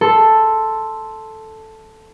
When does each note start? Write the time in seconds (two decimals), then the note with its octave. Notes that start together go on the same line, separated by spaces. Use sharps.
0.01 A4 C6